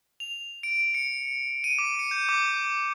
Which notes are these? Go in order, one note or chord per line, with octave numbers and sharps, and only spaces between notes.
F7
D7
C#7
D#7
D6
C#7
G6
D6